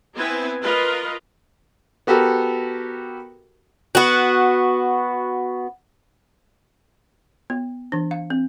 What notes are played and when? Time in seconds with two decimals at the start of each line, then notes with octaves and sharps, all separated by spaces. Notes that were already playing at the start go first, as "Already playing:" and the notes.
0.15 B3 C4 E4 B4 G#5
0.62 F4 A#4 B4 D#5
2.07 B3 F#4 G4 A4 A#4
3.95 B3 F#4
7.50 B3
7.92 E3 D4
8.11 F5
8.30 C4